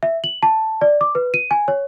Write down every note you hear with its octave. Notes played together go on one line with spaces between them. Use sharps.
E5
F#7
A5
D5
D6
B4
D#7
G#5
C#5